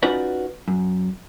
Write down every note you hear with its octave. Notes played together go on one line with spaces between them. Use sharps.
C#4 D#4 F4 F#4 B4 D5
F#2